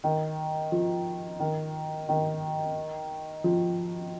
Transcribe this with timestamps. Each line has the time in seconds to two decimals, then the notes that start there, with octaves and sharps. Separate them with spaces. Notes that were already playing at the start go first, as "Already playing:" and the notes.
0.04 D#3
0.72 F3
1.40 D#3
2.09 D#3
3.44 F3